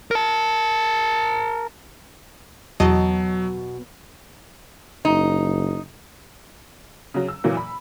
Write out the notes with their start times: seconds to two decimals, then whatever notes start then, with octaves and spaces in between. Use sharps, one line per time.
0.11 A#4 A5
2.80 E2 B2 F#3 D#5 A5
5.05 F#1 D#4
7.14 C#3 F#3
7.28 E6
7.44 A#2 E3 F#3 A#3
7.57 B5